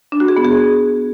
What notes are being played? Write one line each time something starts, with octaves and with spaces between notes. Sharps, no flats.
D4
F#4
G#4
B3
G#4